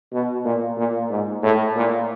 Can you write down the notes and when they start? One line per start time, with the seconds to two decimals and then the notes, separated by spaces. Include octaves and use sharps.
0.12 B2
0.45 A#2
0.77 A#2
1.10 G#2
1.43 A2
1.76 A#2